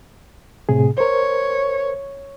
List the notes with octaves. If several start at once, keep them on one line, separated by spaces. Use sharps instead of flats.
A2 C3 G#4
A#4 C5 C#5